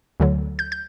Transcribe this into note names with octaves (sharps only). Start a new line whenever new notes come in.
D2 D3 F#3
G6
G6